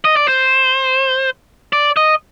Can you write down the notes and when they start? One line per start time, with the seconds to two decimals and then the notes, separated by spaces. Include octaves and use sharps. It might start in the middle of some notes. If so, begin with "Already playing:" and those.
0.05 D#5
0.16 D5
0.28 C5
1.73 D5
1.97 D#5